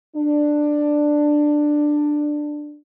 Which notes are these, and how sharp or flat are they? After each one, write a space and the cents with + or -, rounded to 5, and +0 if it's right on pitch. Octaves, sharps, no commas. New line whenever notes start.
D4 +10